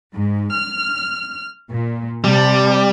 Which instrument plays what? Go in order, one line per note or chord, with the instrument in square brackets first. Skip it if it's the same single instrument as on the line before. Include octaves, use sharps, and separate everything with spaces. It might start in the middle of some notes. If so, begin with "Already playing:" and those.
[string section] G#2
F6
A#2
[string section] C3 A5 [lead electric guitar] G3